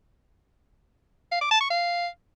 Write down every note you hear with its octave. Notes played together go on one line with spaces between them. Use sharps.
F5
D6
A5
C#6
F5